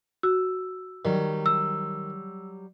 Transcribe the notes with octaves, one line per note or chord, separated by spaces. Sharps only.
F#4 E6
D#3 F#3 G3
E6